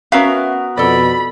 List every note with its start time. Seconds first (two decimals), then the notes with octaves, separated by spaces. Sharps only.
0.12 B3 C#4 F#4 A#4 E5 F5
0.77 F2 B2 A4 D5 B5